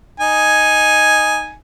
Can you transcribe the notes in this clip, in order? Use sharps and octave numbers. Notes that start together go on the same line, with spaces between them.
D#4 G#5